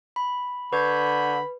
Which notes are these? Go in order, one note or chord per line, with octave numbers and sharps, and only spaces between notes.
B5
D3 B4 B5 C#6 G6 G#6